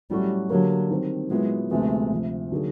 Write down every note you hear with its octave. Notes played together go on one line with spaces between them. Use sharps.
A2 F#3 G3 A3 C#4 F#4
D3 F#3 G3 A#3
D#3 G3 C4
A#2 F#3 G#3 B3 E4
D2 C3 F3 G#3 A3 B3
D2 C3 F3
D3 F#3 A#3 D#4 G#4